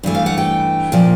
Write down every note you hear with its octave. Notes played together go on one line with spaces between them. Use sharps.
G2 E3 A3
F5
F#5
G5
A#2 F3 A#3